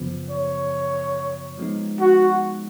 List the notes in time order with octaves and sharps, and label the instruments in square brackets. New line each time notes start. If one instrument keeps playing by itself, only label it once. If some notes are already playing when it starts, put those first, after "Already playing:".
Already playing: [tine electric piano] F#2 C#3 F3 B3
[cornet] C#5
[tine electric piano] F3 G#3 B3 D#4
[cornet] F#4